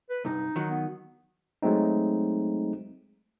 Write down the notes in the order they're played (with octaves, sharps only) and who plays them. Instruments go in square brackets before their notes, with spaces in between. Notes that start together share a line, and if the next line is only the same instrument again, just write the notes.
[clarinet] B4
[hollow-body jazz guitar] C2 G2 [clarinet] D#4
[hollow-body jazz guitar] D#3 F#3
[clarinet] B3
[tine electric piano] F#3 G#3 A3 C4 D#4